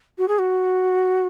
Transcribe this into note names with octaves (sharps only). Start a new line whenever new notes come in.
F#4
G#4
F#4